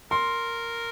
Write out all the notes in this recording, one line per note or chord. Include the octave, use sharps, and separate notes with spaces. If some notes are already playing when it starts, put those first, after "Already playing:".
A#4 C6